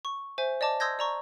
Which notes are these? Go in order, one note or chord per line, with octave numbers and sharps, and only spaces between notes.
C#6
C5 E5 G#5
D5 D#5 A5 D6
C6 D#6 E6 G6 G#6 A#6
D5 A#5 C#6